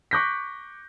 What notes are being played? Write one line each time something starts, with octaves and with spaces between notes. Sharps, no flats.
C#6 D6 F#6 G6 A#6 B6